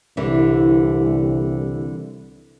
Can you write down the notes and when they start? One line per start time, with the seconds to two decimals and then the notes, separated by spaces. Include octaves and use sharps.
0.17 C2 D3 E3